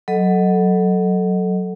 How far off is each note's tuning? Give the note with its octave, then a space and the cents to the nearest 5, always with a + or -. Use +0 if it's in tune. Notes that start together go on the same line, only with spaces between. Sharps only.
F#3 +0 A4 +0 D#5 +0